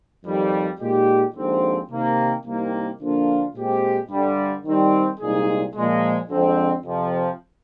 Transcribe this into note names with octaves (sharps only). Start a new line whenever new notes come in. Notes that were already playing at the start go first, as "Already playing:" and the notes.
F2 D#3 G3
A#2 G#3 D#4 G4
D#2 D3 F3 G#3 C4
C3 D#3 A#3
C2 C3 D#3 A#3
D3 F3 A#3 D4 F4
A#2 G#3 C4 G4
G2 D3 G3
D#3 G3 C4
C2 A#2 G#3 D#4 G#4
A#2 F3 G#3
F2 D3 G#3 C4
F2 C3 F3